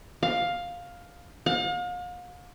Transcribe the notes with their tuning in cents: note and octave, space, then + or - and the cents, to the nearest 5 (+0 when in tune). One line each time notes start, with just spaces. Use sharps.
F5 +10
F5 +40